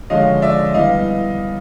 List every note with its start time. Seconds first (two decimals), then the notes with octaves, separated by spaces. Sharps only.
0.10 D3 F3 G#3 C#4 D#5 F5
0.42 D5 E5
0.74 E3 G3 B3 D#5 F5